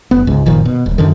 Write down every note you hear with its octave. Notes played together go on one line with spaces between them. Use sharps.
F#1 B3
C#2 G#2
F#1 A#2 D#3 F3
B2
D#1
F#2 D3 D#3